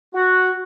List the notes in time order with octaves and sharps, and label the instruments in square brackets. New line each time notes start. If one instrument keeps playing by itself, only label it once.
[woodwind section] F#4